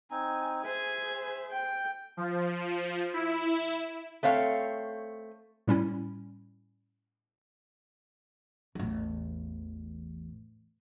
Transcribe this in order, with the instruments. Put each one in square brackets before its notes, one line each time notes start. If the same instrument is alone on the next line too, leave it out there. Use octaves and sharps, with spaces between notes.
[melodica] C4 D#4 [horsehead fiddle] G#5
[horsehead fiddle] G#4 C5 [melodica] E5 [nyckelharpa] G#5
[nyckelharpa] G5
[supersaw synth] F3
E4
[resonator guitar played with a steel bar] A3 C4 C#5 F5
[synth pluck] A2 G3 C#4 E4
[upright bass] A1 E2